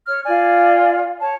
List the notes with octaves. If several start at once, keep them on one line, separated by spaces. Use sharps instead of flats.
C#5 F6
F4 D5 G#5
C#5 A5